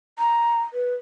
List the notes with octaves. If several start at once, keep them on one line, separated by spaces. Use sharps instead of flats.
A#5
B4